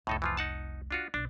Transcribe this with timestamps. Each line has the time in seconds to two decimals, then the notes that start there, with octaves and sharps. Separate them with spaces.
0.07 F1 C2 A2 D#4 A4
0.22 E3 F3 F4
0.37 D#4 F#5 A5
0.91 D4 F4 F#4
1.14 B1 D4